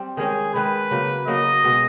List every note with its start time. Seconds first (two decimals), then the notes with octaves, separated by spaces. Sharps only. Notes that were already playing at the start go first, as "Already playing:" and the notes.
Already playing: G3 C4
0.17 D#3 G#3 C#4 G#4
0.54 D#3 G#3 C#4 B4
0.91 C#3 F#3 A#3
1.28 C#3 F#3 A#3 D#5
1.64 B2 G#3 B3